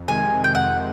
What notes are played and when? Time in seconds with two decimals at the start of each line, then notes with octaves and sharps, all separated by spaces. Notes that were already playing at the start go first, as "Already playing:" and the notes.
Already playing: F2
0.08 C3 D#3 G#3 G#5
0.44 G5
0.55 F2 F#5